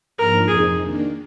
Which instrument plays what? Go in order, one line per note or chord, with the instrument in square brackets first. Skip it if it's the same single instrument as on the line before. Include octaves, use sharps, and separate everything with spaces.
[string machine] G#2 F3 A#3 D4 F4 [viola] A#4
[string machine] F2 C3 F3 C4 D#4 [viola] G#4
[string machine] D#3 A#3 D4